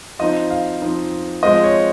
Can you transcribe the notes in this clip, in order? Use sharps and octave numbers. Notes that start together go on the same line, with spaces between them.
F3 C4 D#4 D#5
F5
F3 C4 D#4
F3 G#3 C4 D#5
C#5